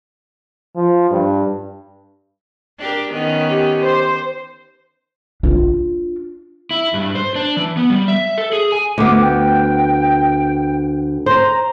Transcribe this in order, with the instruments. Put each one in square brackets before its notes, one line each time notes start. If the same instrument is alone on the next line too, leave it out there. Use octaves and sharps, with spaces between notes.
[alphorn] F3
G2
[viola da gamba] D4 G4 A#4
D#3 B3 C#4
[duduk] G4
[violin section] C5
[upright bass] D4 F4
[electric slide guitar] E4
G2
C5
D4
E3
B3
G3
E5
A4
G#4
G#5
[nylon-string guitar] D2 B3 [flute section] D6
[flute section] G5
[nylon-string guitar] C5 [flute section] A#5